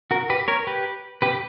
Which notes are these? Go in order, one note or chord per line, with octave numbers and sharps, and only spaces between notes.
F#4 A#4
G4 B4
A#4 C#5
G4 B4
G4 B4